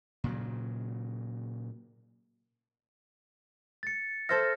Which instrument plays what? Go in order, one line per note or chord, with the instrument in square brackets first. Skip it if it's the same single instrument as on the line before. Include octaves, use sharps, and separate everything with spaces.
[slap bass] A#2 C#3 F#3
[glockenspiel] A6 C#7
[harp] A4 C5 E5 [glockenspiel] F6 A#6